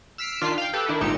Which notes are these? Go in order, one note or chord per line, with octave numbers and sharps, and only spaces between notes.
E6 F6 B6 C7 D7
D#3 D4 F4 F6 B6 C7
F5 G5
G4 A4 B4
D#3 D4 E4
G#1 A#2 D#4 G4 C#7 E7